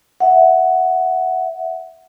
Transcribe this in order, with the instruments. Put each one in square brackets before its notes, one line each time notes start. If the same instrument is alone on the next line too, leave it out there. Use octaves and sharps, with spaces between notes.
[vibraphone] E5 F#5